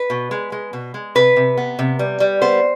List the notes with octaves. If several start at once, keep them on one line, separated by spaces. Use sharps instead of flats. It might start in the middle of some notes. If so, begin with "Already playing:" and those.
Already playing: B4
B2
G#3
G#3
B2
G#3
C3 B4
C3
B3
C3
G3
G3
B3 C5